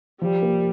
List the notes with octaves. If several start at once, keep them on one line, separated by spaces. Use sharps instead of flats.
F3 G3
A#3